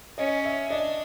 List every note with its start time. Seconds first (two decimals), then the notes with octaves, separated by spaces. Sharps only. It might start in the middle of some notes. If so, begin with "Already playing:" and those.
0.18 C#4 D#5
0.45 E5
0.70 D4 D#5